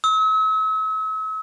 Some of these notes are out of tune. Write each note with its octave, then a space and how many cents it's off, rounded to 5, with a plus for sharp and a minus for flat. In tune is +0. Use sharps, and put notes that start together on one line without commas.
E6 -40